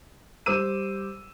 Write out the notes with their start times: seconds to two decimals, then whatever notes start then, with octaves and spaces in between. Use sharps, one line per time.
0.46 G3 C5 D6 E6 D#7